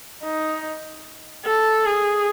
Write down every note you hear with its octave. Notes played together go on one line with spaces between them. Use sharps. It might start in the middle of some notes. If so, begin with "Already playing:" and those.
D#4
A4
G#4